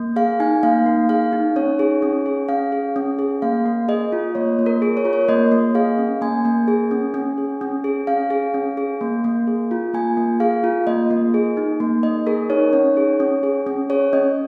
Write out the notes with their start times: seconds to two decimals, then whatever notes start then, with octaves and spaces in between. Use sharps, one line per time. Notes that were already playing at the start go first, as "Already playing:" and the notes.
Already playing: A#3
0.16 G#4 F5
0.40 D#4 G#5
0.63 A#3 F5
0.86 A#3
1.09 G#4 F5
1.33 D#4
1.56 C#4 C#5
1.79 G#4
2.02 C#4
2.26 G#4
2.49 C#4 F5
2.72 G#4
2.96 C#4
3.19 G#4
3.42 A#3 F5
3.66 A#3
3.88 G#4 D#5
4.12 F4
4.35 A#3 C#5
4.59 A#3
4.66 A#4
4.82 G#4
4.97 C#5
5.05 F4 A#4
5.13 C#5
5.28 A#3 D#5
5.52 A#3
5.75 G#4 F5
5.98 C#4
6.21 A#3 G#5
6.45 A#3
6.68 G#4
6.91 C#4
7.14 C#4
7.38 G#4
7.61 C#4
7.84 G#4
8.07 C#4 F5
8.30 G#4
8.54 C#4
8.77 G#4
9.01 A#3
9.24 A#3
9.47 G#4
9.71 F4
9.93 A#3 G#5
10.17 A#3
10.40 G#4 F5
10.64 F4
10.87 A#3 D#5
11.11 A#3
11.34 G#4
11.57 D#4
11.80 A#3
12.03 A#3 D#5
12.27 G#4 A#4
12.50 D#4 C#5
12.73 C#4 C#5
12.97 G#4
13.20 C#4
13.43 G#4
13.67 C#4
13.90 G#4 C#5
14.13 C#4 D#5